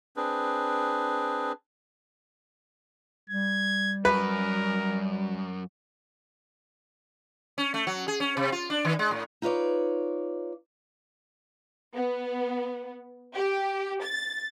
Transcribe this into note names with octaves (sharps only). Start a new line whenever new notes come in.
C4 D4 G#4 B4
G3 G#6
F#2 A#4 B4
C#4
A3
F#3
G#4
C#4
C3
F4
D4
D#3
G#3
A2
D#4 F4 B4 C#5 D5
B3
G4
A6